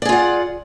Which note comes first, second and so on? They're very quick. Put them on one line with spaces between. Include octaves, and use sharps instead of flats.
D5 G#4 F4 F#5